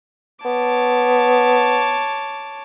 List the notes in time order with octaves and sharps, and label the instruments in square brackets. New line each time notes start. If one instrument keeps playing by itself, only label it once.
[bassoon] B3 [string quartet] C#5 A5 D6